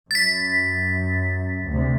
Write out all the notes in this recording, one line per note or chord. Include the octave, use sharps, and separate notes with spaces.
F#2 A6 B6
D2 C3